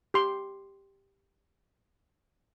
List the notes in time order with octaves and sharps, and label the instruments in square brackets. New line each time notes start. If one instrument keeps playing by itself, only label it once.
[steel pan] G4 C6